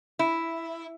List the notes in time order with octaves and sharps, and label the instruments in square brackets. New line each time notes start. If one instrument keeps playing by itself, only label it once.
[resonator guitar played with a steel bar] E4